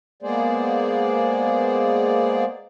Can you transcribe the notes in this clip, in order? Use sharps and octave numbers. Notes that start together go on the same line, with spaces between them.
G#3 A#3 B3 G#4 C5 D5